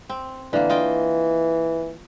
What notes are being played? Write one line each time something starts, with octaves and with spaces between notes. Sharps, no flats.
C4
D3 E3 A#3
F4 D#5 G5